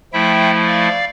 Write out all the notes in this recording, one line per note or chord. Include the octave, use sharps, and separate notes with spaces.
F3 A3 E4 E5 G5
D5 F5